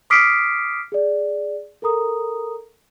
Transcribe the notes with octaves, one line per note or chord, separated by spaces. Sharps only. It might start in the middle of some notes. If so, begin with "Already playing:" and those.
D6 D#6 F6 B6 C7 D7
G#4 D5
A4 A#4 A#5 D#6